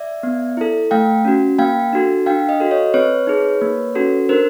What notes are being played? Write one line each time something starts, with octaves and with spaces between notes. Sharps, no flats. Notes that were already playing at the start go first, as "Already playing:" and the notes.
Already playing: D5 E5
B3
E4 A4
A3 F5 G5
C#4 F#4
A#3 F5 G5
D4 F#4 A4
D4 F5 G5
D#5 F5
F#4 A4
C#5 D#5
C4 B4 C#5
D#4 G#4
A#3
C#4 F#4 A4
D4 A#4 C5